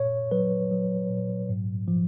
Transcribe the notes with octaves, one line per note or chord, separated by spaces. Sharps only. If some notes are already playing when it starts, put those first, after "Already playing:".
Already playing: A#2 C#5
F#3 B4
F#3
A#2
G#2
F3